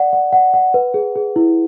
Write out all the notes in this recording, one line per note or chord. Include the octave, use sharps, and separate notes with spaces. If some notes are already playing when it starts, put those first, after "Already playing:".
Already playing: D5 F#5
F#5
F#5
F#5
B4
G#4
G#4
E4